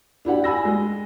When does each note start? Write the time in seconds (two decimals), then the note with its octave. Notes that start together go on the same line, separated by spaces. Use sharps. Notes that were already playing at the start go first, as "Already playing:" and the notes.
0.25 D4 E4 G4 F#5
0.44 G#5 B5 E6 A#6
0.65 G#3